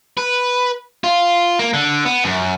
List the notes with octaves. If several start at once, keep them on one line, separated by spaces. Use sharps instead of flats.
B4
F4
A#3
D3
B3
F#2